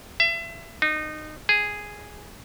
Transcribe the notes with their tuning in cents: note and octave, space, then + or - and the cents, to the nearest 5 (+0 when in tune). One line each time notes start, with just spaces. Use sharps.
E5 +30
D#4 -25
G#4 -5